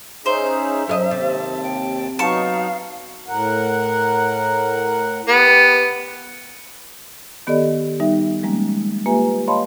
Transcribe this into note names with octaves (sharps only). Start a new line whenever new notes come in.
C#4 D#4 G#4 C5 E5
F#2 A#4 D#5
D#2 C3 A5
G5
F#3 B3 D#4 F5 A5 C#6
A2 A#4 F#5
B3 G4
D#3 B3 G4 A4 D5 D#5
G3 D#4 E5
F3 G3 G#3 A#3 C#4
A#3 F4 G4 B4 E5 G#5
C#5 D#5 F5 A5 B5 C6